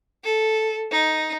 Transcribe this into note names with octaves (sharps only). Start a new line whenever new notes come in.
A4
D#4